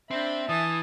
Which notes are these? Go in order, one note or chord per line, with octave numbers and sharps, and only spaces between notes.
C4 D4 E5 B5
E3 G#5 A5 D#6